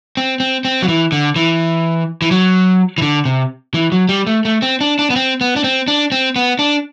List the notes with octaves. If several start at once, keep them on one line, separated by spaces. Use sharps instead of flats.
C4
C4
C4
F#3
E3
D3
E3
E3
F#3
E3
D3
C3
E3
F#3
G3
A3
A3
C4
D4
D4
B3
C4
B3
D4
C4
D4
C4
B3
D4